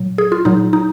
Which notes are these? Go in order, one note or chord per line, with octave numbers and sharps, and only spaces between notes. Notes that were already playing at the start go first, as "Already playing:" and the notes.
Already playing: A#2 F#3
G#4
F4
A#2 F#3 D#4
D#4